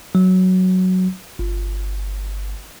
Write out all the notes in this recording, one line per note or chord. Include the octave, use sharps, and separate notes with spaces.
F#3
G1